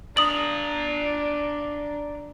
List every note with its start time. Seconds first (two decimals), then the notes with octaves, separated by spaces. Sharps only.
0.17 D4 D5 A#5 D#6 F#7